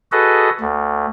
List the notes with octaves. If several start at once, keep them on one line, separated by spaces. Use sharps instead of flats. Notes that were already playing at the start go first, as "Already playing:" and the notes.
F#4 G#4 A4 B4 D#5
D2